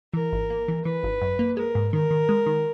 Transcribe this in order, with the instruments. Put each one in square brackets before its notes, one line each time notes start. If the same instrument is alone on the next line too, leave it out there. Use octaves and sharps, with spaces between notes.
[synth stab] E3 [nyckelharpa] A#4
[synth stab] G#1
A#3
E3
[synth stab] E3 [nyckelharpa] B4
[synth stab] G#1
F#2
A#3
[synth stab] G#3 [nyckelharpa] A#4
[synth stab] G#2
[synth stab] D#3 [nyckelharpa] A#4
[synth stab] D#3
G#3
D#3